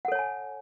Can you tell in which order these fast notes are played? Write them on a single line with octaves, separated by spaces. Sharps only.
F#5 A4 C#5 A5 G#5